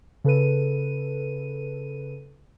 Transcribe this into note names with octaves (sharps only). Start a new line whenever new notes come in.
C#3 A4 B4 D#7